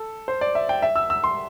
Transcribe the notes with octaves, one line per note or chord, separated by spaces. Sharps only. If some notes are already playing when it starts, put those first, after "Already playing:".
Already playing: A4
C5
D5
E5
G5
E5
E6
E6
C6